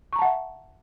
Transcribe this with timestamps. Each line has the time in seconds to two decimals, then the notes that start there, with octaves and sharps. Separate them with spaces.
0.13 C#6
0.16 A#5
0.19 A5
0.22 F#5
0.25 E5